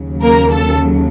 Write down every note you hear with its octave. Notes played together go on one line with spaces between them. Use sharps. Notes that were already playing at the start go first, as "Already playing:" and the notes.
Already playing: D#2 C#3 F#3
A#3 A#4
A4